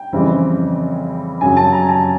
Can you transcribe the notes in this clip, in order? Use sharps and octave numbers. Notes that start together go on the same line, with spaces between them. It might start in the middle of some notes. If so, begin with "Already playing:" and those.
Already playing: G5
F2 C#3 E3 G3 C4
F#2 C#3 F#3 G#5
A5
A#5
A5